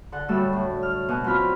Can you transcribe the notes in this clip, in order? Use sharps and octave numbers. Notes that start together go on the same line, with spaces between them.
D3 A4 F#5 A5
A2 F#3 G3 A3 E6
A2
F6
B2
F#3 C4 F4 B5 F6